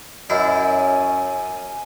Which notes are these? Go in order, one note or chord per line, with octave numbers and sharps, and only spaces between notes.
F#2 C#4 E4 D#5 G#5